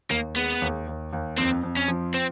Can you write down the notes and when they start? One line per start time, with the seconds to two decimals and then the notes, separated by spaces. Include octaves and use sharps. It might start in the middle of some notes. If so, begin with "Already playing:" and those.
0.10 D#2 A#3
0.36 G#3 B3
0.62 D#2
0.88 D#2
1.13 D#2
1.37 F2 C4
1.63 F2
1.77 C#4
1.88 F3
2.14 C4